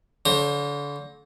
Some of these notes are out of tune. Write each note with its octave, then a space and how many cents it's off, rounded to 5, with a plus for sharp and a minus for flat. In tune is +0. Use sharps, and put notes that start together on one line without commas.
D3 -35 C5 +35